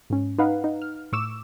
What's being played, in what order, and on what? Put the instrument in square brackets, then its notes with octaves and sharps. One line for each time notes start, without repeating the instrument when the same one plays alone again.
[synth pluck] G#2 C#4
D#4 B4 F5 F#5
D#4
F6
A2 C#6 D6 E6 E7